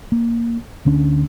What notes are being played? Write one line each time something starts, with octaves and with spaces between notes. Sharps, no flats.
A#3
D2 D3 C#4 D4